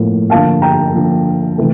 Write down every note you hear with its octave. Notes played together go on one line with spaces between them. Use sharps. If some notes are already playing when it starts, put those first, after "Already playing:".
Already playing: A2 F3 A#3
D3 F3 A#3 F5 A5
G5 A#5
D3 F3 A#3
C3 E3 A3